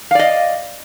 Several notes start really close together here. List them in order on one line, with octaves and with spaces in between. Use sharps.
F5 D5 D#5